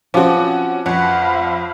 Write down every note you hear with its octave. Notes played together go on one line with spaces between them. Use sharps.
F3 C4 C#4 F#4 D6
F2 C5 C#5 F5 F#5 B5